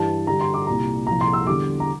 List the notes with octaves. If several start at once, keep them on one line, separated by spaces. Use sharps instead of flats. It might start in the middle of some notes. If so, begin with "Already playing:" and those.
Already playing: G2 E3 G3 A5
G2 D3 G3 A#5
C6
D6
C2 A#2 G3 A#5
C2 A#2 F3 A#5
C6
E6
E2 D3 G3 D6
A#5